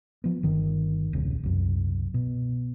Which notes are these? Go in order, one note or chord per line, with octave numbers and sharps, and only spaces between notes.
F3 B3
G1 D#3
D#1 C2 C#3
C2 F#2
B2